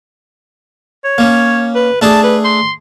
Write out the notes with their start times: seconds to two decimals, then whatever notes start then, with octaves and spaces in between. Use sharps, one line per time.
1.04 C#5
1.18 A#3 C#4
1.75 B4
2.02 A3 D4 G#4 A5
2.24 B4
2.44 C6